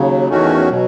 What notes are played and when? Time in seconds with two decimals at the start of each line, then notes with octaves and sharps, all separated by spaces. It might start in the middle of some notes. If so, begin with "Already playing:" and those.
Already playing: D#2 C#3 F#3
0.29 E2 D#3 A3 C#4 F#4
0.70 B2 F#3